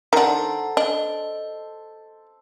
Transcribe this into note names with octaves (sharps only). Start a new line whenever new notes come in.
D#3 D4 A4 C5 F#5 A#5
D4 D#5